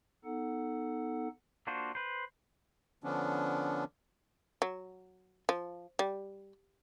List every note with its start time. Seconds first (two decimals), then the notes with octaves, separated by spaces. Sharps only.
0.25 B3 D#4 A4 F#5
1.67 A#3 D4 F4 F#4 C5
1.95 B4 C5
3.04 D3 F3 B3 C#4 D4
4.62 F#3
5.49 F3
5.99 G3